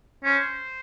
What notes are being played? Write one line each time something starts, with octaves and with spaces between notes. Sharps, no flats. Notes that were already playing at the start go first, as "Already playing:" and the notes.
C#4 C5